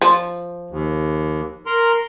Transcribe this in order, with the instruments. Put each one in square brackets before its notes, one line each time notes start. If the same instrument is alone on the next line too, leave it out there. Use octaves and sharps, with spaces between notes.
[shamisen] F3
[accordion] D#2
A#4 A#5 C6